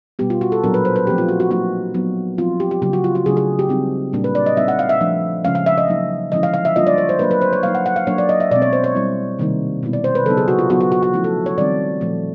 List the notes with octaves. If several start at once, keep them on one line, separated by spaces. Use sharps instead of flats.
B2 G3 B3 G4
F4
F#4
A4
A#2 F#3 B3 D4 A#4
B4
C5
B4
F3 A3 C4 D#4 G4
F4
F#4
F#4
F#3 A#3 D#4 F#4
F#3 B3 D#4
F3 G#3 C4 F4
G4
G4
C#3 F#3 A#3 G4
F#4
F4
F#4
C#3 F#3 A3 D4 G#4
G#4
G4
G3 C4 D#4
A#2 G3 A#3 D4
B4
D5
D#5
G3 C4 D#4 E5
F#5
F5
E5
F3 A3 D4 F4
C#3 F3 G#3 C#4 F5
F5
E5
D#5
F#3 A#3 D#4
D3 F3 G#3 C#4 E4 D#5
F5
F5
E5
G3 A#3 D4 F4 D#5
D5
C#5
C5
F#3 A#3 D4 B4
B4
C5
C#5
F#3 A#3 D#4 F5
F#5
F#5
F5
F#3 A#3 D4 C#5
D5
D#5
E5
B2 G#3 C4 D5
C#5
C5
C#5
G3 C4 E4
C3 D#3 G3 A#3 D#4
B2 G#3 B3 E4
D5
C5
B4
C#3 F#3 B3 D#4 A4
G#4
F#4
F4
F#3 B3 D#4 F#4
F#4
F#4
F#4
F3 A3 C#4 E4
A4
C#5
D#3 G3 C4 D#4 D5
A#2 F3 A3